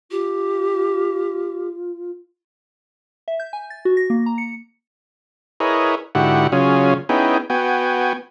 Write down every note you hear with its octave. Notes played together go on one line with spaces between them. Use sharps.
F4 G4
E5
G6
G#5
A6
F#4
A#6
A#3
A#5
C#7
E4 G#4 A#4 B4 C#5 D#5
G#2 D3 E4 F#4 G4 F#5
C#3 F#3 C#4 F4 G#4
B3 C#4 D#4 E4 G#4 G5
B3 F#4 G5 G#5